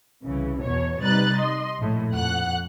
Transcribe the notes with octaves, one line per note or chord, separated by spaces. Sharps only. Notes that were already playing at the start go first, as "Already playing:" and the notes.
C2 C#3 E3
E2 B2 C#5
C3 G3 D#4 B4 F#6 A6
D#5 C6
A#1 A2
F2 F#5 F#6